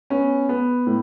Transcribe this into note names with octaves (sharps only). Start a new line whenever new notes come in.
B3 C#4
B3
A2